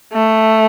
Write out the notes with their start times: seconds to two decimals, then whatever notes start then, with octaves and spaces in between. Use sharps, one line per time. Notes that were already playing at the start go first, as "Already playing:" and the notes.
0.13 A3